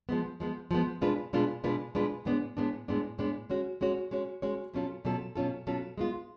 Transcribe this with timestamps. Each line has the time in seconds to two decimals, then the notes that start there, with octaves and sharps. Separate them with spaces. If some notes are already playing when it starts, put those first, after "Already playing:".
0.09 F3 G#3 B3
0.40 F3 G#3 B3
0.71 F3 G#3 B3
1.01 B2 G#3 D4 F4 B4
1.33 B2 G#3 D4 F4 B4
1.64 B2 G#3 D4 F4 B4
1.95 B2 G#3 D4 F4 B4
2.25 A2 G#3 B3 D4
2.57 A2 G#3 B3 D4
2.88 A2 G#3 B3 D4
3.18 A2 G#3 B3 D4
3.50 G#3 C#4 F#4 C#5
3.81 G#3 C#4 F#4 C#5
4.11 G#3 C#4 F#4 C#5
4.42 G#3 C#4 F#4 C#5
4.74 B2 F#3 C#4 F4 A4
5.05 B2 F#3 C#4 F4 A4
5.35 B2 F#3 C#4 F4 A4
5.67 B2 F#3 C#4 F4 A4
5.98 G#3 B3 F4